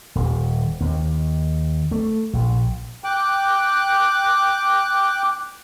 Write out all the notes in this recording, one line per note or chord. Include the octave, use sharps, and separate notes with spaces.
D#1
D#2
A3
A#1
G5 D6 F#6